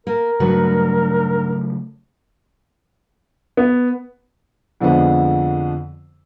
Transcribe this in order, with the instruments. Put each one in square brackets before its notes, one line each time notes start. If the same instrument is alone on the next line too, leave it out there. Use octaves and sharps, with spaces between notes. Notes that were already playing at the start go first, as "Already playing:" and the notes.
[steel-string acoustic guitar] A#3 [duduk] A#4
[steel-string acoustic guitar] G2 F#4 B4 [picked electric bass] C#3 F#3 A3
[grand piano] B3
F2 D3 F3 G#3 B3